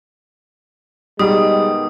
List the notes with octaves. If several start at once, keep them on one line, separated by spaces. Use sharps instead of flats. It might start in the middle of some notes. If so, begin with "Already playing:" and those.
B2 D#3 G3 G#3 D#6